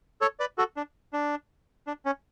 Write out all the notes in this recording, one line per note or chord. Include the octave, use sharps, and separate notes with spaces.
A4 C#5
B4 D5
F#4 A4
D4
D4
D4
C#4